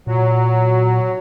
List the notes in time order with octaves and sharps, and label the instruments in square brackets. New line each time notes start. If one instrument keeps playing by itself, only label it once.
[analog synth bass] A#2 [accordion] F#3